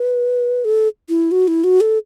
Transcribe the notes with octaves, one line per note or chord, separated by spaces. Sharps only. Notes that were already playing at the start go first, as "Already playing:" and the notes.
Already playing: B4
A4
E4
F#4
E4
F#4
A4